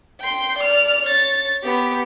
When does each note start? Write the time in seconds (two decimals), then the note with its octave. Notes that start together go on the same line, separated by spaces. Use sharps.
0.20 G5 C6
0.58 D5 F6
1.04 C#5 A6
1.63 B3 G4